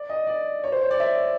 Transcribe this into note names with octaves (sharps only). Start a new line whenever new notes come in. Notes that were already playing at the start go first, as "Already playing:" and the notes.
Already playing: D5
D#5
D5
C#5
C5
C#5
D5
E5